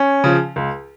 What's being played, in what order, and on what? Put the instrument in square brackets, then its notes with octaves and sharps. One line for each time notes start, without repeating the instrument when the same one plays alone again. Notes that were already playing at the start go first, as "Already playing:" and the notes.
Already playing: [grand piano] C#4
C#3 F3
C#2